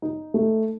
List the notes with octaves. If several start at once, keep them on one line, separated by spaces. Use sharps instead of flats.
D#4
A3